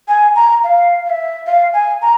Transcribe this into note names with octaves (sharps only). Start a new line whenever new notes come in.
G#5
A#5
F5
F5
E5
F5
G#5
A#5